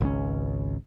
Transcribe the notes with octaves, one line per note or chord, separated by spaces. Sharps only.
G#1 C#2 D3 C#4